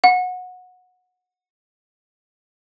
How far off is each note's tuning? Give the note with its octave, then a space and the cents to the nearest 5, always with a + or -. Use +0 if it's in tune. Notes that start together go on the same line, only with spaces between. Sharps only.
F#5 -20